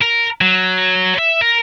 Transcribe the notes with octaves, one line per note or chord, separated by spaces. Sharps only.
A#4
F#3
E5
A#4